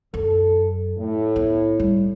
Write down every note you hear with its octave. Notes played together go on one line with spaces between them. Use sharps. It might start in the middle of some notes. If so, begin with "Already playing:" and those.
F#2 A4
A2
B3
G3